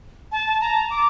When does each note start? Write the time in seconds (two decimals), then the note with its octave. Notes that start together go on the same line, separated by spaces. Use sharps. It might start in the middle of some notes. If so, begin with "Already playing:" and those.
0.32 A5
0.61 A#5
0.90 D6